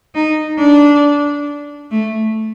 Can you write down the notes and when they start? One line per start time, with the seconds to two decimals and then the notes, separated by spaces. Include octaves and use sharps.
0.15 D#4
0.58 D4
1.91 A3